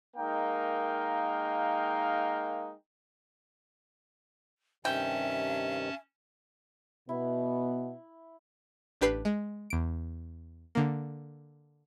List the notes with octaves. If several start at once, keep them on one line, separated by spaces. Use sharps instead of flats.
G#3 A#3 D#4 A#4 F5 G5
G2 C3 D#3 C#4 E5 G5 A5
B2 B3 E4
A1 D4 G4 B4 C7
G#3
E2 D7
D3 A#3